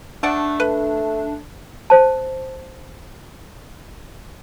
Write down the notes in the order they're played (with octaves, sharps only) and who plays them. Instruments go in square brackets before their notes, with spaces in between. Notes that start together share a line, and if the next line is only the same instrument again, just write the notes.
[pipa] A3 D5 F#5 [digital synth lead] D4
[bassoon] A3 [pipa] B4
[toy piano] C5 A5